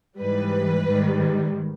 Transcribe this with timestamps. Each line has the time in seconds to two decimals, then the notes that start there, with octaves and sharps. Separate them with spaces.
0.19 G#2 E3 G3 B4
0.87 G#2 D#3 G3